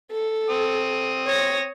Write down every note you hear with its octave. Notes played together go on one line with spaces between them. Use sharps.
A4
C4 D#6
C#5 A#6